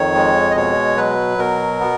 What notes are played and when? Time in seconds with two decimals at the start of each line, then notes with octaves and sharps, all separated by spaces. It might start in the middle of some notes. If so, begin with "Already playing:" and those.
Already playing: F2 D#3 C#5
0.15 G#3
0.51 D#5
0.56 B2 C#5
0.97 F#3 B4
1.38 B2 A#4
1.80 B3